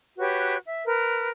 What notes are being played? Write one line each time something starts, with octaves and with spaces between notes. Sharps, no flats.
F#4 G4 B4 C#5
E5
A#4 B4